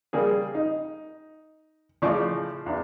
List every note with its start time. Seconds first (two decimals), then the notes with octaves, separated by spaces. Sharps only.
0.13 C#3 G3 A#3 G#4
0.55 D#4
2.02 A2 C#3 F3 D5 C#6
2.66 E2 D4